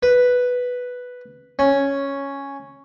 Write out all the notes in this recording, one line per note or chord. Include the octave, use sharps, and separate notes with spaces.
B4
C#4